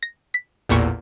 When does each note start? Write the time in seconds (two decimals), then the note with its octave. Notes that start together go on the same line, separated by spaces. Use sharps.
0.03 A#6
0.34 B6
0.69 A1 E2 A#2 C#6